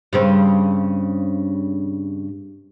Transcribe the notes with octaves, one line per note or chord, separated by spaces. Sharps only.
G2 C#3 C4